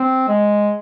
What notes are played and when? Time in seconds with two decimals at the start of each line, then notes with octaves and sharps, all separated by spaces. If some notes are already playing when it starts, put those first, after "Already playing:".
Already playing: C4
0.28 G#3